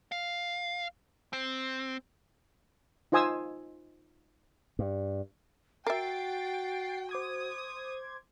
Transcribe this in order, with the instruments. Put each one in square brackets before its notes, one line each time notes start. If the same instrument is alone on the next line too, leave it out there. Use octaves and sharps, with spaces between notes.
[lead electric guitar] F5
C4
[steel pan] D#4 F4 C5 G#5 D#6 E6
[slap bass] G2
[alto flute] F#4 [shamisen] A#4 E5 [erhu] G5 [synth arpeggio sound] A6 C7 D7
[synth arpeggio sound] C5 D6 G#6 [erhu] D#6